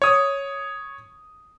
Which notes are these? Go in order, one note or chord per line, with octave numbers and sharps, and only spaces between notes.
C#5 D#6